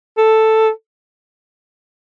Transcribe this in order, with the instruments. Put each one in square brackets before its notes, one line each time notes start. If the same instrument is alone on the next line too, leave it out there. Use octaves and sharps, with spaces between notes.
[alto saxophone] A4